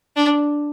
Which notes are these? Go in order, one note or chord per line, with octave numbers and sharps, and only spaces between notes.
D4